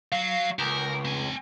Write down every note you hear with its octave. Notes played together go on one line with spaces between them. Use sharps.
F#3 F5
C#2 A#4
C4 G#5